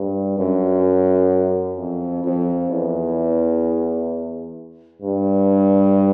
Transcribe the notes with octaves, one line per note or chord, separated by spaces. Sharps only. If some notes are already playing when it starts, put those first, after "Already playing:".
Already playing: G2
F#2
F2
F2
E2
G2